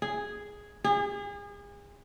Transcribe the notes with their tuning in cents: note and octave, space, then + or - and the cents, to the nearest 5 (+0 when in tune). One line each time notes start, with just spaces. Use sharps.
G#4 +0
G#4 -35